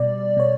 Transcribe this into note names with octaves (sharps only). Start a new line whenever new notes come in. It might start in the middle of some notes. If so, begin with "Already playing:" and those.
Already playing: B2 G3 D5
B2 C#5